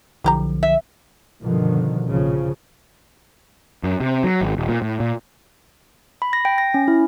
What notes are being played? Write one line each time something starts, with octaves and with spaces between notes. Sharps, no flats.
B1 D3 F3 E4 G4 A#5
E5
G2 B2 D3 D#3 F3
A#1 C#3 F3
F#2
C3
F#3
G#1
D#1
A#2
A2
A#2
B5
A#6
G5
A#6
C#4
E4